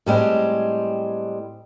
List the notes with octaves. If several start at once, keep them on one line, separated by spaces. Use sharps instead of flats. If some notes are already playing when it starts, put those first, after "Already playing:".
A2 G3 G#3 C4